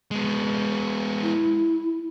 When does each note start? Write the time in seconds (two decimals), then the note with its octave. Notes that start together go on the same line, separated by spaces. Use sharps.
0.11 G#3 B3
1.23 E4